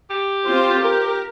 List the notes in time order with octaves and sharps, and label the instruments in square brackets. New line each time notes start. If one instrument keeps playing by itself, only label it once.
[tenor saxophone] G4
[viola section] C4 F4 C5
A#4